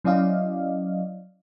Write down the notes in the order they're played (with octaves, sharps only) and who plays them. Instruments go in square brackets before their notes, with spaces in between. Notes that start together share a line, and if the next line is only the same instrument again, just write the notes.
[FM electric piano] F#3 C#4 E4 D5 D#5 F5